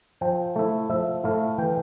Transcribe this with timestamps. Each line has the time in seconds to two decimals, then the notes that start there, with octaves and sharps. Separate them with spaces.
0.21 F3 G5
0.56 A3 E4
0.89 F3 E5
1.23 A3 E4 F5
1.58 E3 G5